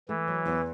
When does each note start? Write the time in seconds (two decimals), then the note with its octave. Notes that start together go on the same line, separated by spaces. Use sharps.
0.09 E3 A3
0.28 F#3
0.46 E2